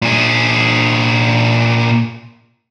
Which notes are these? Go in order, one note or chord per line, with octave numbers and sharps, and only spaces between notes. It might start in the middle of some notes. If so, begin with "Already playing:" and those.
A#2 G#4